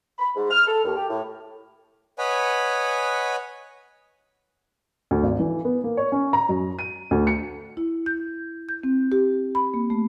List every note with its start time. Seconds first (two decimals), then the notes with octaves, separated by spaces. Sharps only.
0.19 B5
0.36 G#2
0.51 F6
0.67 A4
0.84 D#2
0.97 G4
1.10 A2
2.18 B4 C#5 D#5 F#5 G#5 B5
5.11 D2
5.23 G#1
5.40 E3
5.65 B3
5.84 A#3
5.97 C#5
6.12 C#4
6.33 A#5
6.49 F#2
6.79 D#7
7.11 D2
7.27 C#7
7.77 E4
8.06 G6
8.69 G6
8.83 C4
9.12 G4
9.55 B5
9.74 A#3
9.90 A3